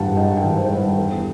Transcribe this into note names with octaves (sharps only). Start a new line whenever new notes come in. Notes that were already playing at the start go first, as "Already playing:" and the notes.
Already playing: G2 D#3 G3 F#5 G5 A5
D#4 G5
G5
D#3
C5
G3 C5
B4
E2 A4
G4